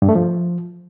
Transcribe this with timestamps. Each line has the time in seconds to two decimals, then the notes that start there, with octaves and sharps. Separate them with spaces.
0.02 G2
0.09 A3
0.15 F3